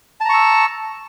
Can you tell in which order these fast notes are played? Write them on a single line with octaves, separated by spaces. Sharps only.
A5 A#5 C#6 E6